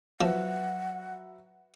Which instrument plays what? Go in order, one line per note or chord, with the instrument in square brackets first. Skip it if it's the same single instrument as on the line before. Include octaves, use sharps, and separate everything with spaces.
[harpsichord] F3 [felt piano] F#3 B4 E5 [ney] F#5